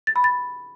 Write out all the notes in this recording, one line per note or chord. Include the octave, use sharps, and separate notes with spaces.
A6
B5
A6